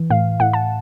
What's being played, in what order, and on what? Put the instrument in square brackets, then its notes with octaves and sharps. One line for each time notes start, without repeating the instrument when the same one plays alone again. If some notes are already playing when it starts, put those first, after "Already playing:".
Already playing: [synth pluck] E3
A2 F5
A2 F#5
A5